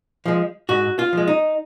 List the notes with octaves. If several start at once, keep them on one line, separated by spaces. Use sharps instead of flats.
F3 G#3
G#2 F#4
F4
F3 G#3
D#4